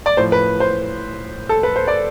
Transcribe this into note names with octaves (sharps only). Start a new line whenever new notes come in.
D5
A2 F3 C5
B4
C5
A4
B4
C5
D5